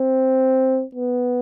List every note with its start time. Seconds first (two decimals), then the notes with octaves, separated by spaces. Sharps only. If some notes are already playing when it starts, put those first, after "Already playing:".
Already playing: C4
0.95 B3